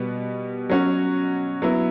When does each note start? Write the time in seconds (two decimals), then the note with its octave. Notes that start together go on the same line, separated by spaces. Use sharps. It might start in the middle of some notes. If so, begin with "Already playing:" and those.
Already playing: B2 G3 B3
0.69 F#3 C#4 F#4
1.62 F#3 B3 E4